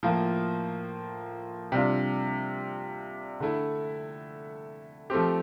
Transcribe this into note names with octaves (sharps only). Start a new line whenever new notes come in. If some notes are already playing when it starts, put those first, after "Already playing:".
A2 F3 A#3 F4
C3 G3 D4 F4
D3 A3 E4
F3 A3 C4 G4